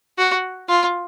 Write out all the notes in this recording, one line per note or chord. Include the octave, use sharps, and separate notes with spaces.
F#4
F4